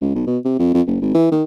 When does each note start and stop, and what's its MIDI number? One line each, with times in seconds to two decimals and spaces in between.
0.01 0.12 37
0.15 0.24 35
0.27 0.38 47
0.45 0.58 48
0.59 0.74 41
0.74 0.82 41
0.87 0.97 30
1.02 1.14 32
1.15 1.27 52
1.32 1.43 51